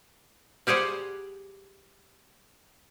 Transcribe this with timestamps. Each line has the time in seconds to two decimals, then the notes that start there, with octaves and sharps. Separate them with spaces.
0.67 G3 G4 G#4 C5 F#5